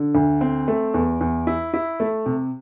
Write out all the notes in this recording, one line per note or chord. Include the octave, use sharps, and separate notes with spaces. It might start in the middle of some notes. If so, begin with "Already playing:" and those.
Already playing: D3
D2
C4
A3
E2
E2
E4
E4
A3
C3